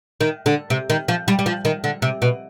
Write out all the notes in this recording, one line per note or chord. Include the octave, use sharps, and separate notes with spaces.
D#3
D3
C3
D#3
F3
G3
G3
F3
D#3
D3
C3
B2